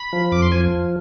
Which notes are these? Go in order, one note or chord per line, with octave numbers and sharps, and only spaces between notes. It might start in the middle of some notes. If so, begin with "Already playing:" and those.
Already playing: B5
F3
F2 D6
C6
F3 G#5